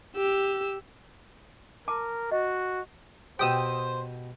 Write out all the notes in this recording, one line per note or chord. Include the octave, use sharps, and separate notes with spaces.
G4 E6
A#4 A5 D6
F#4 D#5
B2 G4 C5 G5 D#6 E6